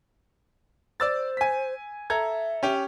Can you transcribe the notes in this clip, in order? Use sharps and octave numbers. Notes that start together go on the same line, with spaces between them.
C5 D5 E6 A6
G#5 B6
A4 E5 A#5 G#6
C#4 G4